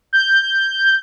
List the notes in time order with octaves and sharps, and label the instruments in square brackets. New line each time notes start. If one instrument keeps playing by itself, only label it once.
[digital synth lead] G6